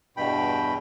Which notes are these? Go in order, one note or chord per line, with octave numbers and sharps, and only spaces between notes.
E2 G2 B2 G5 B5